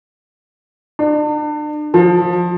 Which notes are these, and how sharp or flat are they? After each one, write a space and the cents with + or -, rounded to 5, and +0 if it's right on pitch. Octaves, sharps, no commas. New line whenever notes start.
D4 +35
F3 +20